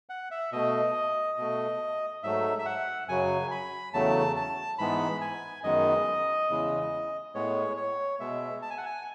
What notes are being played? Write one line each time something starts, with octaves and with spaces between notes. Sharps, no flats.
F#5
E5
B2 A3 D#5
B2 A3
G#2 F#3 A3 E5
E5
F#5
F#2 C#3 F#3 G#5
B5
E2 C#3 F#3 A3 A5
A5
G#2 E3 G#3 B3 B5
G#5
F#2 D#3 G#3 B3 D#5
E2 C#3 E3 G#3
A2 G#3 B3 C#5
C#5
B2 G#3 B3 E5
A5
G#5
F#5
G#5